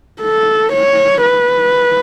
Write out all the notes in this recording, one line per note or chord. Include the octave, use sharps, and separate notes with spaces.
A4
C#5
B4